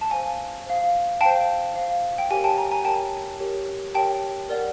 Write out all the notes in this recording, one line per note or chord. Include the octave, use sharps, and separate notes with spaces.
A5
C5 F5 G#5
C5 F5
C5 F5 G5 A5
C5 F5
G5
G4 A#4 C#5 G#5
G5 A5
G#5 A#5
G#5 A#5
G4 A#4 C#5 G5 A5
G4 A#4 C#5
G4 A#4 C#5 G5 A5
A#4 D5 F#5